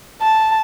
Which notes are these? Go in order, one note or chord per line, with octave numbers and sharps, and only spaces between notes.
A5